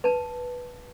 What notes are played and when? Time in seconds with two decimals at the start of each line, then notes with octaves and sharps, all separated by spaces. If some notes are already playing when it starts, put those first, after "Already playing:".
0.04 B4 A5